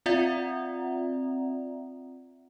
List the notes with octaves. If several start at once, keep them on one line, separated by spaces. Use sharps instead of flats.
C4 F4 D5 E5 F#5 A#5